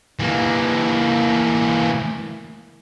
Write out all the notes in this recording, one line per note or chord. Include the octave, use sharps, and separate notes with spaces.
E3 A#3